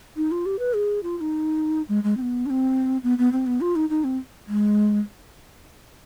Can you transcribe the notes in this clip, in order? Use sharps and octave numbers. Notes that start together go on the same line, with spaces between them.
D#4
F4
G4
B4
G#4
F4
F4
D#4
G#3
G#3
C4
B3
D4
C4
B3
B3
C4
B3
F4
D#4
D#4
C4
G#3